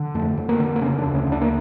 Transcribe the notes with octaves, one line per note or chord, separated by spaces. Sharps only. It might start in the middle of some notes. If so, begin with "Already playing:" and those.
Already playing: D3
F2 A3
F2
A#3
D3
A#3
C#3 C#4
D4
D2
C#4
D2
D4
A#3